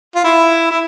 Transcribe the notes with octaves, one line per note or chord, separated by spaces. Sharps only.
F4
E4
E4